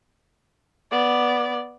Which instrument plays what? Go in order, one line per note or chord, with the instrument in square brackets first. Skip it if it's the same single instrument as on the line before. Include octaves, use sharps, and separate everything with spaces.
[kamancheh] B3 D5